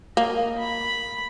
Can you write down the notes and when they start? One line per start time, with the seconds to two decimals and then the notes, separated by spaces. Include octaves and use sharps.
0.17 A#3 D#5
0.58 B5